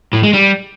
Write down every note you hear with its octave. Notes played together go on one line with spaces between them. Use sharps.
A2
G#3
G3